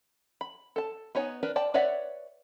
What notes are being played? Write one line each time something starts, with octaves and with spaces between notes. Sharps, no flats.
B5
A4 A5
B3 D#4 C#5 G#5
D4 A#4 B4
D5 G5 A5
B4 C#5 D5 E5 F#5